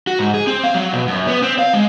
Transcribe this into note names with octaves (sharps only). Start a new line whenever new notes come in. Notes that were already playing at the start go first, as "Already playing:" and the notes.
F#4
G#2
G#4
C4
F5
F#3
B2
F#2
B3
C4
F5
G#3